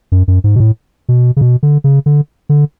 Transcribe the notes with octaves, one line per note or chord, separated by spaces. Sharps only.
F#2
F#2
G#2
B2
A2
B2
C#3
B2
D3
C#3
D3
D3